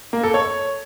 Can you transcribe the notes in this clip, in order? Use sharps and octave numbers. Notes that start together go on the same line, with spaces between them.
A#3
A4
C#5